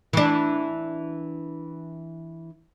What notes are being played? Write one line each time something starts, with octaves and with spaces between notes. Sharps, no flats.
E3 D4